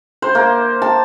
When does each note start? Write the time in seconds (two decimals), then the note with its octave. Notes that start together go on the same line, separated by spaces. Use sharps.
0.22 C5
0.35 A#3
0.82 A5